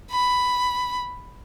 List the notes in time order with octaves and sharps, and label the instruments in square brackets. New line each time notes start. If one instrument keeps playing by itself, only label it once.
[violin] B5